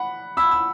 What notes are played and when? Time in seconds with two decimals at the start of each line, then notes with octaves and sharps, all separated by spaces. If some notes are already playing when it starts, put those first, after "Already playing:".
Already playing: F#5 B5
0.37 B5 E6
0.51 E6